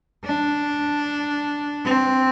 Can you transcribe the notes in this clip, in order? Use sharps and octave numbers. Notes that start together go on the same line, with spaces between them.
D4
C4